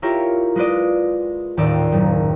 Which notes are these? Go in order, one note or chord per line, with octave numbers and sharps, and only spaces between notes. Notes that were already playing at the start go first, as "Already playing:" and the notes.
E4 F4 G4 A#4 C#5 E5
G#3 F4 B4 D5 D#5
D#1 D#2 A2 D5 E6
F#1